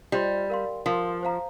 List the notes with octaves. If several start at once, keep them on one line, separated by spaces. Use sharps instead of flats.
G3 F4 C5 D#5 C6
A#4 F5 C6
F3 A#4 F5 C6
C5 F5 A#5